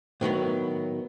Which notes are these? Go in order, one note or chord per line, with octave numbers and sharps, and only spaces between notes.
A2 D#3 F#3 B3